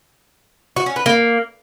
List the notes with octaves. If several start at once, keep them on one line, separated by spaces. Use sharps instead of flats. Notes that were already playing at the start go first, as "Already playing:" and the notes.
F#4
C#4
B4
A#3